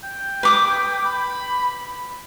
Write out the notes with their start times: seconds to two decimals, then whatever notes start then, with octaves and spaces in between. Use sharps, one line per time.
0.03 G5
0.43 B4 D6 D#6
1.05 B5